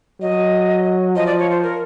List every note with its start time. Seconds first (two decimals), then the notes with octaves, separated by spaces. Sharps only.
0.21 F#3 D#5
1.15 F3 D#5
1.27 D5
1.39 C#5
1.51 C5
1.63 A#4